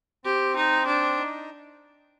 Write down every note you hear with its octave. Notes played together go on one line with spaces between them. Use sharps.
C4 G4
D#4
D4
D#4